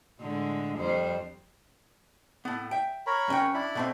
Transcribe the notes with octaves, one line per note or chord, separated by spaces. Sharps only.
A2 D3 G#3
F2 G3 C5
A2 B3
E5 G5
A#4 C#5 B5
F#2 C#4 G5
D4 E4 B5
B2 A3 C4